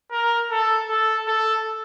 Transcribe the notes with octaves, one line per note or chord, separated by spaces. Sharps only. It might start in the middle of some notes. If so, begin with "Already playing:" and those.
A#4
A4
A4
A4